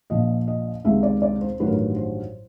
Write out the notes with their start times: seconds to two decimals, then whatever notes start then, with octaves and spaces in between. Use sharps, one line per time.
0.10 A#1 A#2 F3 D#5
0.48 D#5
0.85 C#2 C3 D#3 G#3 B3 E5
1.03 D5
1.22 D5
1.41 C5
1.60 A1 G2 D#3 F#3 B4
1.67 A#4
1.73 B4
1.96 C5